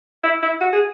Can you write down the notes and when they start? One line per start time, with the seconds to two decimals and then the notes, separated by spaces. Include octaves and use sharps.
0.23 E4
0.42 E4
0.61 F#4
0.73 G#4